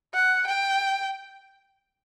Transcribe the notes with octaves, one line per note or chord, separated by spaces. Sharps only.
F#5
G5